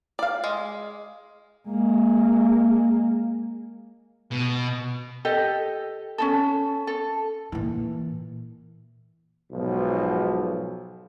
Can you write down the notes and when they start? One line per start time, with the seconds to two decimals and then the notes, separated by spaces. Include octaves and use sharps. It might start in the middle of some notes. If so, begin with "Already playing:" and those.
0.19 D5 F5
0.44 G#3
1.68 G#3 A#3
4.31 B2
5.25 G4 A4 D#5
6.18 C#4 D#4 A4
6.87 A4
7.52 A#2 E3
9.51 B1 G#2 F3 F#4